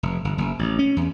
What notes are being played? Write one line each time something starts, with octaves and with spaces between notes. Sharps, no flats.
F1
G1
F#1
A1
C#4
E2